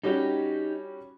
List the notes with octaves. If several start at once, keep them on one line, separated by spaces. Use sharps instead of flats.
G3 C#4 D#4 F#4 G4